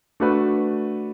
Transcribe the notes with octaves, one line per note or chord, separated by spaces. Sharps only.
A3 D4 F#4 B4